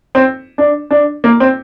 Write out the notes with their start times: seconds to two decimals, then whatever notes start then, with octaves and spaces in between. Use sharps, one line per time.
0.15 C4
0.58 D4
0.91 D4
1.24 A#3
1.40 C4